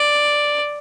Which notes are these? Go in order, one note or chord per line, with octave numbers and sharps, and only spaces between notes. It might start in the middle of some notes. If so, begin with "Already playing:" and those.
Already playing: D5